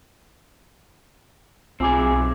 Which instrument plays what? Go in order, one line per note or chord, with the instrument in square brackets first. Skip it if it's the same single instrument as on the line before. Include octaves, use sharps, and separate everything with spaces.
[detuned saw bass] B1 [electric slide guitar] C4 G#4 [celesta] F4 G#5 D6